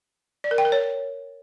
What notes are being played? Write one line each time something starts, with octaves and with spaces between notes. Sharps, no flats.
D5
A#4
G5
A#4
C#5